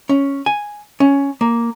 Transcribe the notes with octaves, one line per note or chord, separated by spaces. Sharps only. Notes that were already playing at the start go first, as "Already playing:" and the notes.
C#4
G#5
C#4
A#3